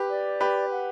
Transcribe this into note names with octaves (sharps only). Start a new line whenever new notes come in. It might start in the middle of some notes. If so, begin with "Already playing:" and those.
Already playing: G4 B4
D5
G4 B4
F#5